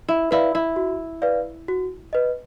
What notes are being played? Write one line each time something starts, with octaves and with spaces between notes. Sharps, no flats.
E4
E4 B4 D5 F5
E4
F#4
B4 D5 F5
F#4
B4 D#5